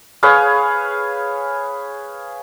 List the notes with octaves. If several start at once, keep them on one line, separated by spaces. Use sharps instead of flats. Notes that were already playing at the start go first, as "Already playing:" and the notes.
G#4 B4 C#5 F5